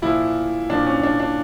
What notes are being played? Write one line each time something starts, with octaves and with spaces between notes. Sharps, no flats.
A#2 F3 E4
A#2 F3 D4
C#4
D4
D4